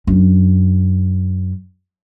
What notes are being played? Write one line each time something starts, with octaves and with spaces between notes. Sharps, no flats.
F#2 D4